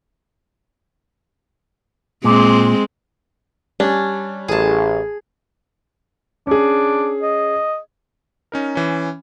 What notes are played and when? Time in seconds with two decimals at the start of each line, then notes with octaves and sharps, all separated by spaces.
2.24 A#2 G#3 C4
3.80 G3 C#4 D4
4.48 A1 G#4 A5
6.47 C#4 D4 G#4
7.22 D#5
8.52 C#4 D#4 A#4
8.75 E3 C#4